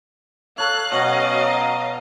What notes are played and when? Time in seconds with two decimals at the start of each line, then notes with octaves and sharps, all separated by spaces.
0.58 A4 C#5 F5 F#6
0.92 B2 F#3 C#4 D#5